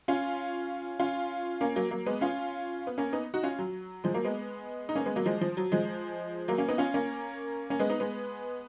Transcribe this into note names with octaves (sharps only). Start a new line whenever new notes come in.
C#4 F4
C#4 F4
A#3 C#4
F#3 A#3
F#3 A#3
G#3 B3
C#4 F4
B3
A#3 C#4
B3 D#4
D#4 F#4
C#4 F4
F#3
F3 G#3
F#3 A#3
G#3 B3
D#4
A#3 C#4
G#3 B3
F#3 A#3
F3 G#3
F3
F#3
F3 G#3
F#3 A#3
A#3 C#4
B3 D#4
C#4 F4
A#3 C#4
A#3 C#4
G#3 B3
B3 D#4
G#3 B3